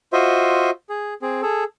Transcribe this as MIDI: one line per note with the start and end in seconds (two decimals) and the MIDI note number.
0.13 0.70 65
0.13 0.70 66
0.13 0.70 72
0.13 0.70 75
0.13 0.70 76
0.89 1.14 68
1.22 1.42 60
1.22 1.42 68
1.42 1.64 68
1.42 1.64 69